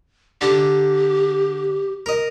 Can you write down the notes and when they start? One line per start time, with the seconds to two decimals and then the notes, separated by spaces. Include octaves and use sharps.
0.41 D3 G4
2.06 A#4 D#5